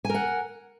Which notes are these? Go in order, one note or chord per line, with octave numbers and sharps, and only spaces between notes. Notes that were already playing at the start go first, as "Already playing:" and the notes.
A#4 F#5 G#5